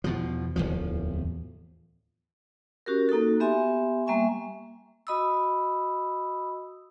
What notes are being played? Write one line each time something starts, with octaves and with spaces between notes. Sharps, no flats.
E2 B2 F3
D1 A#1 E2 F3
C#4 F#4 G4 A#4
A#3 D#4 F#4 A4
B3 G4 E5 G#5 C6
G3 A#3 E5 G#5 C#6
F#4 D#5 B5 D#6 E6